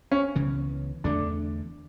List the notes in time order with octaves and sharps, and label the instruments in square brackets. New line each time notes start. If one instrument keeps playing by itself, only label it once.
[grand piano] C#4
[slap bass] C#2 C#3 E3 B3
[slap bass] E2 D3 A3 [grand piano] D4